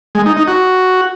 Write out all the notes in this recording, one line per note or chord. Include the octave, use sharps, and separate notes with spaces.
G#3
D#4
D#4
F#4